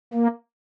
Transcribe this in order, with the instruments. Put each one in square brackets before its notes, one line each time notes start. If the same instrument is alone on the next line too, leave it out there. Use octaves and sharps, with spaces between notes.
[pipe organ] A#3